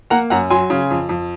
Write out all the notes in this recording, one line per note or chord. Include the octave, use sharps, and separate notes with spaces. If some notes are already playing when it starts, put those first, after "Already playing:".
A#3 F#5 A#5
F#2 F#5 A#5
F#3 G#5 C6
C#3
F2
F2